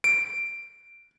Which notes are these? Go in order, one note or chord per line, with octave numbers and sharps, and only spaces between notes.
D7